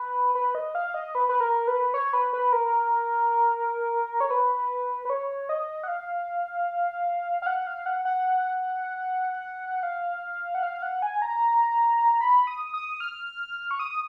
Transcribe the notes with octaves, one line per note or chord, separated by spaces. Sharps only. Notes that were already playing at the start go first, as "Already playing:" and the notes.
Already playing: B4
B4
D#5
F5
D#5
B4
B4
A#4
B4
C#5
B4
B4
A#4
C#5
B4
B4
C#5
D#5
F#5
F5
F5
F#5
F5
F#5
F#5
F5
F#5
F5
F#5
G#5
A#5
B5
D#6
D#6
F6
C#6
D#6